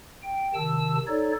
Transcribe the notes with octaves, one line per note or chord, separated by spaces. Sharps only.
G5
C3 D#3 A5 E6
D#4 A4 C#5 D5